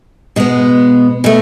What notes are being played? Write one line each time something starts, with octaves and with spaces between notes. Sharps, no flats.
B2 G#3 B3
B2 A3